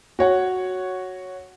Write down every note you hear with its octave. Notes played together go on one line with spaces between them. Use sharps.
F#4 C#5 F#5